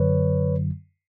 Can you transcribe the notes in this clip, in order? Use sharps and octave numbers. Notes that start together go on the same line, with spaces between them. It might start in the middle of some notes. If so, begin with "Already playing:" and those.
Already playing: F#2 D3 F#3 B4 C#5